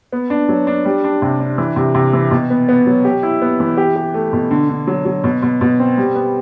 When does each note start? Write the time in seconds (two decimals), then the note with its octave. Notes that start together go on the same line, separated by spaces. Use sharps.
0.12 B3
0.30 D4
0.49 F#3
0.67 D4
0.85 G3
1.04 D4
1.22 C3
1.40 D4
1.58 E3
1.76 C3
1.95 C3
2.13 E3
2.31 B2
2.50 B3
2.69 B3
2.86 F#3
3.05 G4
3.23 E4
3.42 B3
3.60 E3
3.77 G4
3.96 G4
4.14 A3
4.33 B2
4.51 D3
4.69 D3
4.87 F#3
5.05 F#3
5.24 B2
5.43 B2
5.61 B2
5.79 C4
5.97 G3
6.15 B3